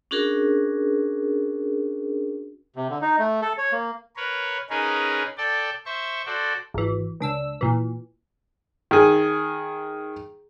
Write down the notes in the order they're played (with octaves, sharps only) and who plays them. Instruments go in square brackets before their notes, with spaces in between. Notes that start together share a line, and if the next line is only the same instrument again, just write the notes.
[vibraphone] C#4 D4 F#4 G#4 A#4
[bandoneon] C3
D3
D#4
A3
A4
C#5
A#3
[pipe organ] A#4 B4 C#5
C#4 D#4 G#4 A#4 B4
A4 D5 G5 A5
C5 E5 C#6
F#4 A4 C5 D5
[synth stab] G#1 E3
C#2 D4 E6
A#2 E3
[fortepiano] D#3 G#4